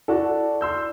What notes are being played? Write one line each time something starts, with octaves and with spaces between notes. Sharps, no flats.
E4 F#4 A4 D5
C6 E6 G6